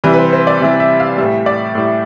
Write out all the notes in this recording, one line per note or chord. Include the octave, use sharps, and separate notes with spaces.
C3 E3 G3 B4
B4
C5
C5
D5
C3 E3 G3 E5
E5
F5
A2 G3 E5
D5
A2 G3